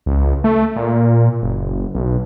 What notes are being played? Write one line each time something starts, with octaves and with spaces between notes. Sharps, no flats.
C#2
A3
A#2
F#1
B1